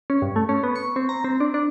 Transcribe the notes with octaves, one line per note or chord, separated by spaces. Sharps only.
C#4
G2
A3
C#4
B3
C#6
C4
A#5
C4
D4
D4